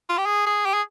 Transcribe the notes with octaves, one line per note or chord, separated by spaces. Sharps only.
F4
G4
G#4
G#4
G4
G#4